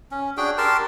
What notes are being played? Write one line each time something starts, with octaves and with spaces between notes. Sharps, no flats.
C#4
D4 F#4 G#4 G5
G4 A#4 A5 C6